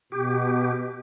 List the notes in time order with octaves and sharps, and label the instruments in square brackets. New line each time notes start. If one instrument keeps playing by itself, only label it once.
[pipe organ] B2 [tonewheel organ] G4